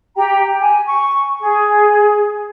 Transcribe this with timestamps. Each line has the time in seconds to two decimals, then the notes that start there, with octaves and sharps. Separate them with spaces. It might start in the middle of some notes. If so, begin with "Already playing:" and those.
0.16 G4 G5 A#5
0.60 G#5
0.85 C#6
1.40 G#4